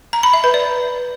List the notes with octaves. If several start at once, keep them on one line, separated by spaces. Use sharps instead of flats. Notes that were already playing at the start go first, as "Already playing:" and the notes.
A#5
B5
E5
B4
D5